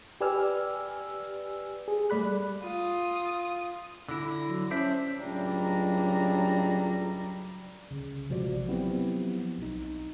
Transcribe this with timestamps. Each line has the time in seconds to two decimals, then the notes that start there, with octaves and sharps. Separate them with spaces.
0.21 G4 B4 D5 G#5 E6 F6
1.88 G#4
2.10 G3 A3 D5 B5 F#6
2.63 F4 D#6
4.09 D3 E4 A#6
4.49 F#3
4.71 C#4 D4 C5 E5
5.20 C#2 A2 F#3 G3 D4 A#5
7.91 C2 C#3
8.29 A1 C3 F3 G#3 F#4 D5
8.68 F3 F#3 B3 C4 E4 G4
9.58 B1 D#4